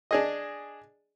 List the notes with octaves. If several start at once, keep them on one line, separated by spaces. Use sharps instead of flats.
D4 G#4 D#5